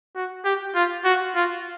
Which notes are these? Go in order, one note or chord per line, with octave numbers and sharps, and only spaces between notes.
F#4
G4
F4
F#4
F4